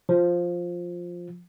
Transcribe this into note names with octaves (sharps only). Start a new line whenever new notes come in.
F3